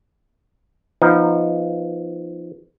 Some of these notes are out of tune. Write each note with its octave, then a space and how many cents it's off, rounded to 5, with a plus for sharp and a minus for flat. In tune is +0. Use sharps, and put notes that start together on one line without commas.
F3 -15 B3 +0 D#4 +0